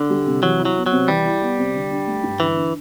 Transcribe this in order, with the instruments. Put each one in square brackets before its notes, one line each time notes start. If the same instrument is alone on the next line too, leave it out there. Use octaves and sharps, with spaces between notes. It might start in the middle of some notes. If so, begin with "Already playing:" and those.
Already playing: [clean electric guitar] D3 [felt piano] D4
[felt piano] G3
C2
[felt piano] E3 [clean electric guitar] F#3
[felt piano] E4
[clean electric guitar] F#3
[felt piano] B3
[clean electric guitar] F#3
[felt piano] C3
[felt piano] E3 [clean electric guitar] G3
[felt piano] E4
B3
C3
D3
D4
A3
G2
[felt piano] D3 [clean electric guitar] E3
[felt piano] D4